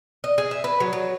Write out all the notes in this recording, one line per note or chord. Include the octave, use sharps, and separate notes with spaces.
D#5
G#4
E5
B4
F#3
F#3